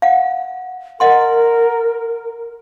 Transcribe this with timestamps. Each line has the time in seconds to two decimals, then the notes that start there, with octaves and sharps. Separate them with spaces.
0.02 F5 F#5
1.00 A#4 D#5 F#5 C6